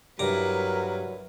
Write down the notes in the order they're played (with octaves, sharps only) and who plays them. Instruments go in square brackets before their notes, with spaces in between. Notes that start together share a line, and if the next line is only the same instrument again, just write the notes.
[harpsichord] G2 A#5 D6 [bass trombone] F#3 [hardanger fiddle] E4 B4 [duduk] A#4